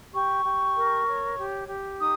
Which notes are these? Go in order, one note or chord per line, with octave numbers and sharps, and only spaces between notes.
G4 C#6
G4
A#4
C#5
G4
G4
D#4 D#6